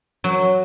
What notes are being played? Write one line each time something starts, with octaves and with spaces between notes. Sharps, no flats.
F#3